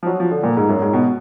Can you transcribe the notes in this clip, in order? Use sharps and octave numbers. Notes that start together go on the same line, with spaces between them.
F3
F#3
F3
D3
A#2
G#2
F#2
G#2
B2